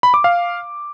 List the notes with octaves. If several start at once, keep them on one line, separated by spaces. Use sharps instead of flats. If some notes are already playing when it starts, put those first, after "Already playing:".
B5
D6
F5